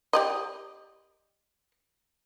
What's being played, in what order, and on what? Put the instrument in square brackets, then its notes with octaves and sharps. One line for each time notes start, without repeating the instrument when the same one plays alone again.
[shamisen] G4 D5 D#5